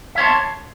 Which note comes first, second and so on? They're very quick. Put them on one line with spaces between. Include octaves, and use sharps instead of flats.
E5 C#5 C6 A5